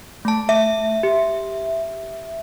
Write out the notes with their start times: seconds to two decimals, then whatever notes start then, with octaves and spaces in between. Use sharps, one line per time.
0.25 A3 A5
0.49 E5
1.03 G4